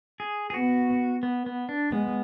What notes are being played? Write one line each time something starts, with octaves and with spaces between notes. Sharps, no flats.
G#4
G#4
B3 F#4
B3
B3
D4
G#3 B3